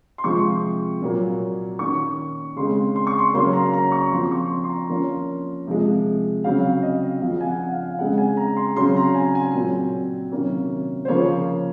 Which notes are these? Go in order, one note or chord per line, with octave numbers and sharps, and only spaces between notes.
C6
C3 F3 G#3 C4 C#6
A#2 F#3 A#3
D#3 A#3 C#4 C#6
C#3 G#3 C4 C6
C6
C#6
C6
C#3 F#3 A#3 C#4 C6
A#5
A#5
C#6
F3 C4 C6
C#6
C6
C6
A#5
F3 A#3 C#4
C3 F3 G#3
C#3 F#3 C4 F5
D#5
C#3 F3 C4 F5
G#5
F#5
F5
C#3 G#3 C4 F#5
G#5
A#5
C6
C#3 F#3 C4 C6
A#5
G#5
G#5
A#2 F#3 C4
C3 D#3 F#3 A#3 C#4
C5
C#3 F3 A#3 C#5